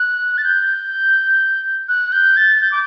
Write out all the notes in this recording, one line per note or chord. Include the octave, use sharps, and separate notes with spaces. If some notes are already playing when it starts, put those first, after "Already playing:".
Already playing: F#6
A6
G6
F#6
G6
A6
G6
D6